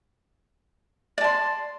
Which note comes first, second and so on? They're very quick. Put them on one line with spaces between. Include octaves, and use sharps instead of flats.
D5 A5 C6